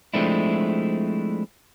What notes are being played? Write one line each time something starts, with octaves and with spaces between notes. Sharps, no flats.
F3 G#3 A3 C4 D4 E4